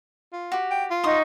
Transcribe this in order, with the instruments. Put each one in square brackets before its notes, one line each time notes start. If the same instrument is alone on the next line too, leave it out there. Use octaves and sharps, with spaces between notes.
[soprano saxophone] F4
[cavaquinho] F#4 G4
[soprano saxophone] G5
F4
[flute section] D#4 F#4 C#6 [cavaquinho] C6 D#6